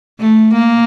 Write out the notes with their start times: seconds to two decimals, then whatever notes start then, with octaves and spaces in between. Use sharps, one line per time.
0.20 A3
0.54 A#3